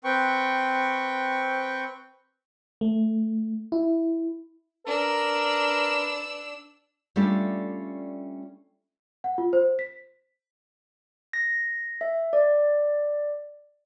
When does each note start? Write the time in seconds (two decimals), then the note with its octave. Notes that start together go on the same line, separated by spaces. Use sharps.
0.04 C4 B4 G5 C#6
2.81 A3
3.72 E4
4.87 D4 A#4 B4 E6
7.16 G3 A3 C#4 D4 F4 A4
9.24 F#5
9.38 F4
9.53 C5
9.79 B6
11.33 A#6
12.01 E5
12.33 D5